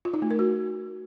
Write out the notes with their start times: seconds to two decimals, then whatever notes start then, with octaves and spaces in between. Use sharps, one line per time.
0.05 F4
0.14 D#4
0.22 A3
0.31 A#4
0.39 F#4